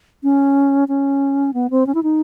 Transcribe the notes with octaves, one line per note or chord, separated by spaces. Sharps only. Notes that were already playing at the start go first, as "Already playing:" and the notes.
C#4
C#4
B3
C4
C#4
E4
D#4